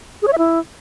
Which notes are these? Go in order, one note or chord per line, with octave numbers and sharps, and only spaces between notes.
G#4
C#5
E5
E4